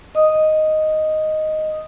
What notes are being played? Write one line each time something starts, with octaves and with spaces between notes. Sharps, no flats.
D#5 D#6